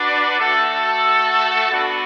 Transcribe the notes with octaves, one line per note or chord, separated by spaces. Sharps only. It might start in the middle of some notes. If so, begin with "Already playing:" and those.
Already playing: D4 F#4 B4 D5
A3 F#4 A4
B3 D4 F#4